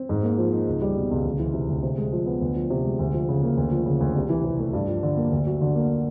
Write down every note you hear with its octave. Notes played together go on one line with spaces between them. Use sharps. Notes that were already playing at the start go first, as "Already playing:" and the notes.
Already playing: C4
G#2
A#3
F3
D#4
C#2
G3
B2
C#2
D2
E3
C3
D2
C3
G#3
F3
B3
D2
F3
C3
G#3
D2
F3
C#3
A#3
D2
F3
C#3
D2
C2
E3
C3
A3
G2
F3
D3
A#3
D2
F#3
D3
A#3